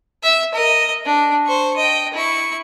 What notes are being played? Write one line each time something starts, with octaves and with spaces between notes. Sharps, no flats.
E5 E6
A#4 D#5
D4
C5 C#6
D#5 G5
E4 C#6